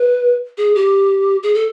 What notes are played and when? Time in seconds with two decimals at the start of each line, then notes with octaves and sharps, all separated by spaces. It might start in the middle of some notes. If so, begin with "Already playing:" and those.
Already playing: B4
0.57 G#4
0.75 G4
1.43 G#4
1.54 A4